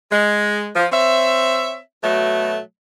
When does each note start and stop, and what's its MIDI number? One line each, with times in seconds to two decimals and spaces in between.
0.12 0.69 56
0.76 0.87 53
0.92 1.79 60
0.92 1.79 73
0.92 1.79 76
2.04 2.59 47
2.04 2.59 54
2.04 2.59 57